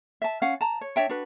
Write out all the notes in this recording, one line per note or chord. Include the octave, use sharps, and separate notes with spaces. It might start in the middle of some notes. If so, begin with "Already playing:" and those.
E5 A5
C#4 F5 F#5
A5 A#5
C#5
D4 C#5 E5 G5
D4 F#4 B4